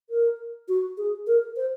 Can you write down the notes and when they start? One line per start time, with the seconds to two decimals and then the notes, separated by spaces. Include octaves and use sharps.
0.10 A#4
0.68 F#4
0.98 G#4
1.27 A#4
1.56 C5